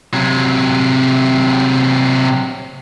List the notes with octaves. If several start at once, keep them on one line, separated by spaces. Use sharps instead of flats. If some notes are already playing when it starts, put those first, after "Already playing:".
C3 F#3